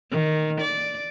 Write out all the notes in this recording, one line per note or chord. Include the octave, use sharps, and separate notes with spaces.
D#3
D5